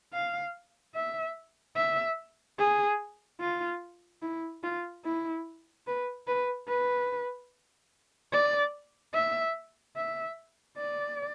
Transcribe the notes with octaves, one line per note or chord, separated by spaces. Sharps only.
F5
E5
E5
G#4
F4
E4
F4
E4
B4
B4
B4
D5
E5
E5
D5